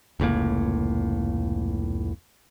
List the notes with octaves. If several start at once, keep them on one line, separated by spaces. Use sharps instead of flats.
F1 C#2 A2 A#3